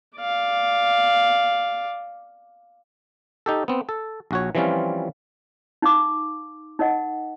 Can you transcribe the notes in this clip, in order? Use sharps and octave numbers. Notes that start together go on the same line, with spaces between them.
D5 F5
D#4 G4 A4
B3 C4
A4
A#1 F#4 C#5
E3 F3 G3 C4 C#4 F4
D#4 F5 D6
D#4 A#4 D#5 F#5